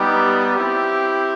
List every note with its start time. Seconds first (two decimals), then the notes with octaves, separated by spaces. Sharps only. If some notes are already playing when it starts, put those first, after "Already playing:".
Already playing: G3 B3 D#4 G4
0.57 C4 E4 G4